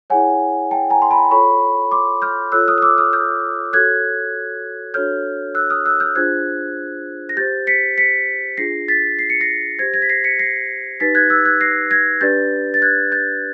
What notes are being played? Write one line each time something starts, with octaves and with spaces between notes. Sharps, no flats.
E4 G#4 C#5 F#5 G#5
G5 A5
G#5 A#5
C6
A5 B5
F4 A4 C#5 B5 C#6
C6 D6
F6 G6
F4 A4 C#5 E6 F#6
D#6 F6
D#6
D6 E6
D#6 F6
F6 G6
F#4 A4 C#5 F#6 G#6
D4 F#4 A4 C#5 F6 G6
E6 F#6
D#6 F6
E6 F#6
F6 G6
D4 F4 G#4 C5 F#6 G#6
A#6
G4 C5 G6 A6
B6 C#7
B6 C#7
D4 F4 G#4 A#6 C7
A6 B6
C7
C#7
A#6 C7
G4 C5 G#6 A#6
G#6 A#6
B6
A#6 C7
B6 C#7
A#6 C7
D#4 G4 B4 A6 B6
F#6 G#6
E6 F#6
F#6 G#6
A#6 C7
G#6 A#6
D4 G4 B4 D5 G6 A6
A6
F#6 G#6
G6 A6